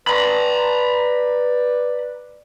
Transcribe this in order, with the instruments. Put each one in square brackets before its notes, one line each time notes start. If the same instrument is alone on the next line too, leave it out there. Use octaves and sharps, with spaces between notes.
[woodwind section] B4 D5 [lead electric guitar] A#5 B5